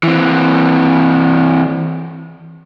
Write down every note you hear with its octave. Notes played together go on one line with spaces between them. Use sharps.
E3 C4